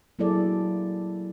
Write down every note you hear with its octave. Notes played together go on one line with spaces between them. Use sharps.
F#3 A#3 E4 G#4 A4 D5